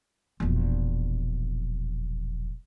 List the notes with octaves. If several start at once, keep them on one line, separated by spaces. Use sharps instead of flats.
E1 A#1